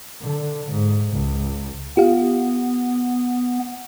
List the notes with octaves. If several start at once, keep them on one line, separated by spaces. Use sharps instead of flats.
D3
G#2
C#2
B3 F4 G4 F5